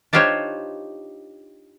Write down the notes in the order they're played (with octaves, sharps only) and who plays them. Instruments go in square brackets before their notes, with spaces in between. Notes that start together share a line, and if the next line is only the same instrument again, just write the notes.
[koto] D4 D#4 F4 G4 C5 C#5